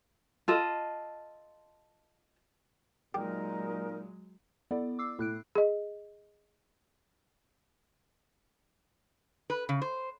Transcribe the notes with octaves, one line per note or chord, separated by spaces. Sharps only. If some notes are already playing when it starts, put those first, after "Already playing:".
F4 A4 D#5
A#2 F#3 G#3 D#4 G4 A#4
B3 E4 A4 D5
D6 E6 C7
A2 E4 F#6 D7
G#4 D#5
B4
C#3
C5